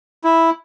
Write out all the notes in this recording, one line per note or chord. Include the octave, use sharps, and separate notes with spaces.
E4